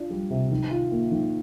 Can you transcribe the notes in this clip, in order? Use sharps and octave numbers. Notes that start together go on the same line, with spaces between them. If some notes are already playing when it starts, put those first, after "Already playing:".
Already playing: D4 F4
G3
C3
D#3
F4
A#3
D#3